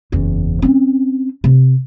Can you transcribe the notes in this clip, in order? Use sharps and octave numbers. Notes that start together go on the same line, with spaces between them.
F#1 E2
C4 C#4
C3